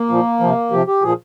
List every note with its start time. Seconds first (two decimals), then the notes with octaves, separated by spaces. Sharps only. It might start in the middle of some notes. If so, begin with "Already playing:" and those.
Already playing: A#3
0.09 A#2 F3
0.40 C3 F3
0.71 C3 F3 G4
0.87 G4
1.02 A#2 F3 G#4